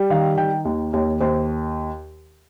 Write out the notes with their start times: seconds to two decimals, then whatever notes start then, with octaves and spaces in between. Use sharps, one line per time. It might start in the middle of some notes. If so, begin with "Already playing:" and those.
Already playing: G3
0.10 D#3 F5
0.37 D#3 G5
0.65 D#2
0.93 D#2 C#5
1.20 D#2 C5